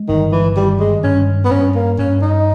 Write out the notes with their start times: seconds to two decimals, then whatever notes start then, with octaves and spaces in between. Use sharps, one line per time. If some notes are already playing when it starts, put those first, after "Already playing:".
Already playing: G#3
0.08 G1 D#3
0.32 E3
0.56 D#3 G3
0.80 G#3
1.04 G2 C#4
1.45 B3
1.51 G2 C#4
1.75 A#3
1.99 G2 C#4
2.22 D#4